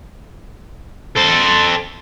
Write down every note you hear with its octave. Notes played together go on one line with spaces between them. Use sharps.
A4 C5